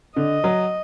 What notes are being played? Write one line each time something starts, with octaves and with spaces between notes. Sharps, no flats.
D3 D#5
F#3